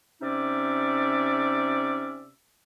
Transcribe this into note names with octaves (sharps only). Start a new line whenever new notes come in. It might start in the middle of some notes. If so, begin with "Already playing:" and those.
C3 C#4 D#4 D5 E5